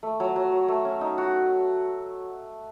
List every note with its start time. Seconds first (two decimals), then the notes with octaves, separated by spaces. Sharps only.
0.03 A3
0.20 F#3
0.36 F#3
0.52 F#3
0.68 A3
0.85 C#4
1.01 D#4
1.18 F#4